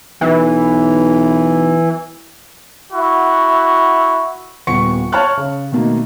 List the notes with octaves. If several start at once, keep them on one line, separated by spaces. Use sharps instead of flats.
B1 E3
E4 F#4
D#1 B3 C#6 C#7
C#5 A5 C#6 F6 F#6
C#3
B2 D#3 A3 A#3